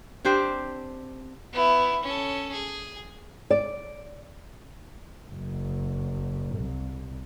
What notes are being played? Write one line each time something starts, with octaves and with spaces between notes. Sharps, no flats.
C4 D4 G4 C5
B3 E4
C#4 A4
G#4
D5
F#1
C2